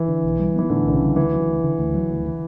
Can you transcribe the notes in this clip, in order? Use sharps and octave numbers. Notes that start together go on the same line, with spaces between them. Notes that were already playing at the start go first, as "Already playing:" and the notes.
Already playing: E3
D3
B1
G3
E3 B3
A2 D3
B1 D3
C#3
G3
D2 E3
F#3
D2
D3
D2
F#3
D2
E3